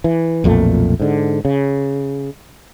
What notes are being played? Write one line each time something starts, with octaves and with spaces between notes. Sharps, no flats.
E3
B1 F2 A#2 A3
G#2 D3
C#3